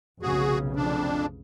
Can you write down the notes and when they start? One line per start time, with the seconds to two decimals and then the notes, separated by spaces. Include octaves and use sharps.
0.22 F1 B1 C#3 F#4 G#4
0.76 F2 D4